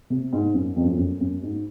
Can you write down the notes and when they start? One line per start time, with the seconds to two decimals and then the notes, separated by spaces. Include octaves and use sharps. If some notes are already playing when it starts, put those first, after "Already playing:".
0.10 C3
0.33 G#2
0.54 F#2
0.76 F2
0.84 F#2
0.91 F2
0.98 F#2
1.21 F#2
1.43 G#2